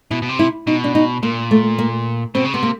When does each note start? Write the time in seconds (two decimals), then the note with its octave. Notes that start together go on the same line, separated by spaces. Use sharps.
0.11 B2 E4
0.22 B2
0.29 C3
0.39 E4
0.67 B2 D#4
0.84 D4
0.95 D#4
1.23 A#2 A#3
1.51 A3
1.79 A#3
2.35 B2 C4
2.45 C#3
2.53 C3 B3
2.63 A#3